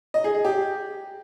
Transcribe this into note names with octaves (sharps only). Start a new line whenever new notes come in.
D#5
G#4
G#4
G4